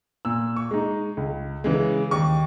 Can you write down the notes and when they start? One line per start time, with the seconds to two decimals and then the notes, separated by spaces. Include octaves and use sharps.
0.25 A#2 E6
0.56 C#6
0.71 G#3 D#4
1.17 C#2
1.64 C#3 E3 G#3
2.11 D#2 C#6